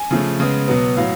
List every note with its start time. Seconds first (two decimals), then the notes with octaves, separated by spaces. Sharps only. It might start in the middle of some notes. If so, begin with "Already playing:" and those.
Already playing: G#5
0.11 C#3 F3 A3
0.40 C#3 G#3 B3
0.68 B2 F#3 B3
0.97 A2 F#3 F5